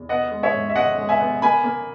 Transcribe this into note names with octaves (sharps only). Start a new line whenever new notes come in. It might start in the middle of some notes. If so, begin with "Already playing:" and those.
Already playing: E2
B3 D#5 F#5
G#3
C#5 E5
G#2
E5
G#3 D#5 F#5
G#3
E5 G#5
B3
A#3 G#5 B5
A#3